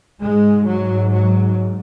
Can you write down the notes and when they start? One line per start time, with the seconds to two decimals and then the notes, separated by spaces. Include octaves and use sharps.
0.21 G#2 G#3
0.68 F#3
1.13 F#3